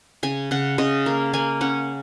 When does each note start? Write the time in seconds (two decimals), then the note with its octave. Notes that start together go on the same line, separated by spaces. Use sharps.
0.23 C#3 G#5
0.51 C#3 F#5
0.78 C#3 D#5
1.06 A#3
1.33 A#3 G#5
1.61 C#4 F#5